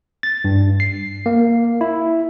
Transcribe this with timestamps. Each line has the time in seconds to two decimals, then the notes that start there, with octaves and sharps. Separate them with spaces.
0.23 A6
0.44 G2
0.80 C7
1.26 A#3
1.81 E4